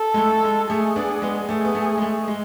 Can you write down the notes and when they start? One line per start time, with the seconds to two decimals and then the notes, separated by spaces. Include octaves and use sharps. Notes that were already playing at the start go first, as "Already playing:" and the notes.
Already playing: A4
0.14 G#3
0.17 A3
0.44 G#3
0.70 A3 G#4
0.96 B3 D4
1.22 G#3 B3
1.48 A3 G#4
1.65 B3
1.75 A3
1.97 G#3
2.02 A3
2.28 G#3